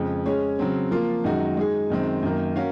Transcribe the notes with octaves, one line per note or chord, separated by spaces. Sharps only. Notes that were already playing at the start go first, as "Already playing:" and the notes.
Already playing: F2 C#3 G#3
G#3 C#4 G#4 C#5
C#3 F#3 C4
F3 A#3 F4
F#2 D#3 G#3 D#4 F#4
G#3 D#4 G#4
F#2 D#3 G#3 C4
F#2 D#3 A#3
C#4 F#4 A#4 F5